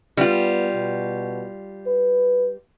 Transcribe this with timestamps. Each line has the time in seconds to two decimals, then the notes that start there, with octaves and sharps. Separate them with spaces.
0.17 G3 B3 F4
0.73 B2
1.86 B4